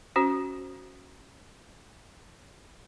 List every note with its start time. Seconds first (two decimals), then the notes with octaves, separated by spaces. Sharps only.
0.16 C#4 F#4 C5